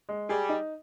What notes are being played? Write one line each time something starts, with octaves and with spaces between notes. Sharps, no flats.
G#3
G3 G#4
D#4